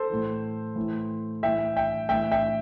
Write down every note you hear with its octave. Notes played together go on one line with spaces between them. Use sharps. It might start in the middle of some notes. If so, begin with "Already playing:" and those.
Already playing: A4 C5
A2 E3
A2 E3
A2 E3 E5 G5
E5 G5
A2 E3 E5 G5
E5 G5